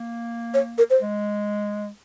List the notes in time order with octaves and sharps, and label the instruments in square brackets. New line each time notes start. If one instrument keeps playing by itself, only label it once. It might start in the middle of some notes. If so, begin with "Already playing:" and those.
Already playing: [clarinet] A#3
[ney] C#5
A#4
C5
[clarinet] G#3